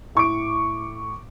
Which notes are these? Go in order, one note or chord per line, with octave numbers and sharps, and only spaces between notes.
A2 C#6 D6 D7